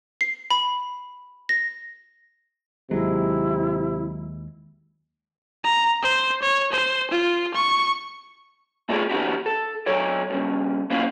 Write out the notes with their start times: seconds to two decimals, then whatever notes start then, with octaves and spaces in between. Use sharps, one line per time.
0.21 C7
0.51 B5
1.49 A#6
2.91 D#2 C3 F#3 G#3 E4
5.64 A#5
6.03 C5
6.42 C#5
6.72 C5
7.11 F4
7.54 C#6
8.89 A3 E4 F4 G#4 A4 D5
9.09 E3 D4 E4 F#4 G4
9.46 A4
9.86 F#3 A4 C#5 D5
10.30 G2 C#3
10.90 F2 A#3 C#4 E4 C5 F5